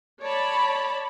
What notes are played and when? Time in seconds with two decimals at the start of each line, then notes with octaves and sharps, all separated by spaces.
0.20 C#5 D5 A5 B5